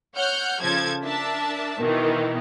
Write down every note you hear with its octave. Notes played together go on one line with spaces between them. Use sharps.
C#5 F#5 F6 G6
C#3 F3 A4 A5 G#6
D4 A#4 E5 A5
B2 D#3 E3